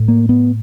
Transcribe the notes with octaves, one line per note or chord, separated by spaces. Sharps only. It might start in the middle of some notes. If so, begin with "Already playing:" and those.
Already playing: A2
A#3
B3